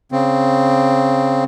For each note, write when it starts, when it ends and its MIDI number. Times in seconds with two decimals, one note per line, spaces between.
0.12 1.44 49
0.12 1.44 60